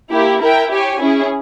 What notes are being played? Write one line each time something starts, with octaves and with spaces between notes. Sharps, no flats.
A#3 E4 G4
E4 A#4 E5 G5
G4 C#5 G#5
C#4 E4 G#4